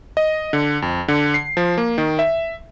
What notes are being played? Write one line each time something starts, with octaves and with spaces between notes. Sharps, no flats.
D#5
D3
F2
D3
C7
F3
A#3
D#3
E5